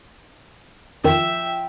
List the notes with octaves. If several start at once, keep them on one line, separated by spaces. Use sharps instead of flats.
F2 D#3 F3 E5 G5 E7